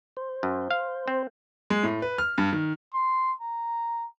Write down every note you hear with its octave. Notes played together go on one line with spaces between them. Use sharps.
C5
F#2
F5
C4
G#3
A2
B4
F6
G2
D#3
C6
A#5